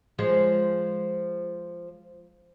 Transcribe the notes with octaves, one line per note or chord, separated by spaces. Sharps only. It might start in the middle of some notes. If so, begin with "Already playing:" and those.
F3 G#3